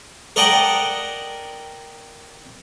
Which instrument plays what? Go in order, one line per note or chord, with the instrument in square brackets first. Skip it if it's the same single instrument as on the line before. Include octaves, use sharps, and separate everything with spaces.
[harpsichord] A#4 D5 D#5 F#5 G5 A5